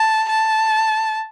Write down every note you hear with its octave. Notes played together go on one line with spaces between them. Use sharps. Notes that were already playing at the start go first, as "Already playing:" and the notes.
Already playing: A5
A5